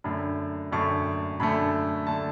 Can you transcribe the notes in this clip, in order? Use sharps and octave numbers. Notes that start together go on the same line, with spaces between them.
F#2 D3 A3 B5
F#2 D3 A3 C#6
F#2 D3 A3 B5
D3 A3 A5